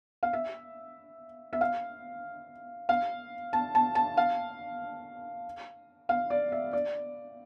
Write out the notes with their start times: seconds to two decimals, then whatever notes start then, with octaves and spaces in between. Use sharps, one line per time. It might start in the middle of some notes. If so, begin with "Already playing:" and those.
0.23 F5
0.33 E5
1.53 E5
1.61 F5
2.89 F5
3.53 A5
3.75 A5
3.95 A5
4.17 F5
6.09 F5
6.30 D5
6.52 E5
6.73 D5